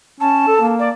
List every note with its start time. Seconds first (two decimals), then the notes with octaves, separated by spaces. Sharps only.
0.21 C#4 A5
0.47 A4
0.61 A#3
0.79 D5